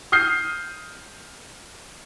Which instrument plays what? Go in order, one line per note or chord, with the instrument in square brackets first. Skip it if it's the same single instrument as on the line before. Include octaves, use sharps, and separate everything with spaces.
[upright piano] D#6 F6 G6 C7